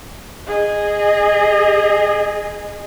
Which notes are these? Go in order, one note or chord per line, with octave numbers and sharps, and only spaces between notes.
G#4 D#5